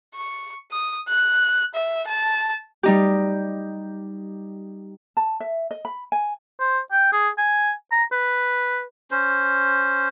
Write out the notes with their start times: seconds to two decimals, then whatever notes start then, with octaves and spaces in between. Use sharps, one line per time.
0.15 C#6
0.71 D#6
1.09 F#6
1.74 E5
2.07 A5
2.83 G3 D#4 G4
5.17 A5
5.40 E5
5.71 D#5
5.85 B5
6.12 G#5
6.60 C5
6.92 G5
7.12 G#4
7.38 G#5
7.91 A#5
8.12 B4
9.11 C#4 C5